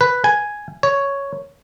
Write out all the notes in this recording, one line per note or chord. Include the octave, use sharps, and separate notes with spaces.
B4
G#5
C#5